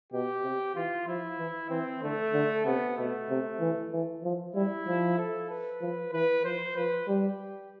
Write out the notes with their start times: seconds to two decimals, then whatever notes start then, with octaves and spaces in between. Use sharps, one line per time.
0.12 B2 G4
0.43 C3
0.75 E3 F4
1.07 F3 E4
1.38 E3
1.70 E3 C4
2.02 D3 A3
2.33 D3
2.65 C3 B3
2.97 B2 A3
3.29 C3
3.60 E3
3.92 E3
4.23 F3
4.54 G3 E4
4.87 F3
5.18 A4
5.50 B4
5.81 F3
6.13 E3 B4
6.44 F3 C5
6.76 F3 B4
7.08 G3 G4